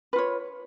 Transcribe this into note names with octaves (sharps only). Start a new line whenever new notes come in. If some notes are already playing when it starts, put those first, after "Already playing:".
F4 B4 C#5